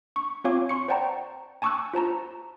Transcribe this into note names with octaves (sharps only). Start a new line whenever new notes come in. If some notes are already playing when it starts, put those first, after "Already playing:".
C#6
C4 F4 C#5 F5 G#5 D6
C6 C#6 C#7
C5 D5 F#5 G5 A5 A#5
G#5 A5 C#6 D6 E6 F#6
F4 C5 A5 A#5